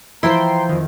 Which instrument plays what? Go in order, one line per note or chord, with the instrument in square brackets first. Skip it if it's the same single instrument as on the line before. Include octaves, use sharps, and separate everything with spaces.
[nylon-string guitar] E3 F3 C5 [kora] E4 [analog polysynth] G5 C6 [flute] A#5
[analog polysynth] F2 D#3